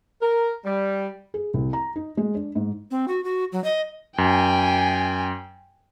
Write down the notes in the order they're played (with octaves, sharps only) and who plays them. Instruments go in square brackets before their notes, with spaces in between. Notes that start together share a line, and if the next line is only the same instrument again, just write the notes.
[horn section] A#4
G3
[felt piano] G#4
C2
A#5
D#4
G#3
D4
G#2
[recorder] C4
F#4
F#4
F#3
D#5
[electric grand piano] F#2 [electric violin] G5 G#5